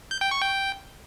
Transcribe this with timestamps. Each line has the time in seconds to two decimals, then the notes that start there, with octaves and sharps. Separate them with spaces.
0.11 G6
0.21 G5
0.31 C#6
0.42 G5